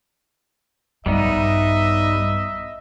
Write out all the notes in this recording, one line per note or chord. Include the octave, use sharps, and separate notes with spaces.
A#1 G2 G3 B3 D#4 D#5 E5